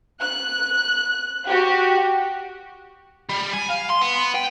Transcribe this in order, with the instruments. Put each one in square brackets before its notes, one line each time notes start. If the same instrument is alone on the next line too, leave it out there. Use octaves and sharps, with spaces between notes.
[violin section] F#6
F#4 G4
[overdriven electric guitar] G3
G#5
F5
C6
B3
G5